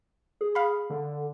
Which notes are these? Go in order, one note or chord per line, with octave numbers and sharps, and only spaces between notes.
G#4
F5 B5
D3